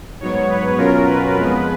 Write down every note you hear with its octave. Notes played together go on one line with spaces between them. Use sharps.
G#2 F#3 B3 C#5
B4
B2 F#3 C#4 F4 A#4
B4
F2 F3 G#3 B3